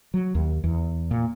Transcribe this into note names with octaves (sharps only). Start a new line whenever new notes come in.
F#3
D#2
E2
A#2